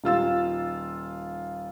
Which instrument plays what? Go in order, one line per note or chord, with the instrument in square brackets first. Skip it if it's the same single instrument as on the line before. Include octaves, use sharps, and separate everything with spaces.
[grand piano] D#1 F4 E6 A6